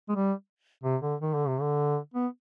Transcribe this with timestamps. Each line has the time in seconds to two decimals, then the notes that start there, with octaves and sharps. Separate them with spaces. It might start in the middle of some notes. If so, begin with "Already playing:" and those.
0.09 G#3
0.15 G3
0.84 C3
1.02 D3
1.21 D#3
1.34 D3
1.47 C3
1.61 D3
2.14 B3